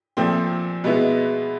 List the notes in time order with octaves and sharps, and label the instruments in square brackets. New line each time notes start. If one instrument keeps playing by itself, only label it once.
[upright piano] A#2 F3 A3 C4
B2 G#3 B3 E4